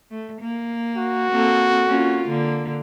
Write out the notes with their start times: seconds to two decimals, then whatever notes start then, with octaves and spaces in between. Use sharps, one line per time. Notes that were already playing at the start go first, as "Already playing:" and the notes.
0.11 A3
0.41 A#3
0.97 F#4
1.31 A#3 C4 A4
1.86 A#3 C#4 F4
2.28 D3 A#3